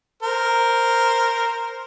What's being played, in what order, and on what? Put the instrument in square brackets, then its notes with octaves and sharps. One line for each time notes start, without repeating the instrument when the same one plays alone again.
[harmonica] A#4 C5